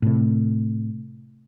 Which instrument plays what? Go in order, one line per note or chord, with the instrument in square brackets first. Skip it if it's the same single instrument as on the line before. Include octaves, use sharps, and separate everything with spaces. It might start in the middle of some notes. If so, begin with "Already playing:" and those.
[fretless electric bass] A2 C3